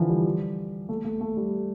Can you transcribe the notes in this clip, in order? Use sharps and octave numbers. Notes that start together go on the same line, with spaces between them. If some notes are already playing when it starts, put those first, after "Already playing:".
Already playing: D3 E3 F3
G3
A3
A3
A3
G3